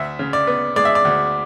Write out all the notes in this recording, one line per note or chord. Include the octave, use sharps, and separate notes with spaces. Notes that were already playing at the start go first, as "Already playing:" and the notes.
Already playing: D2 E5
C#3
D5
B3
G#3 D5
E5
D5
D2